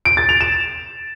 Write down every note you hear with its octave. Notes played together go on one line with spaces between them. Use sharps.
D7
A6
F7
E7